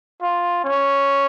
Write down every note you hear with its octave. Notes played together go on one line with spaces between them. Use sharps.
F4
C#4